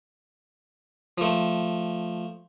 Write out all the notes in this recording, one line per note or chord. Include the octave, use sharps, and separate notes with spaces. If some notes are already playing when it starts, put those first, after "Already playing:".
F3 A3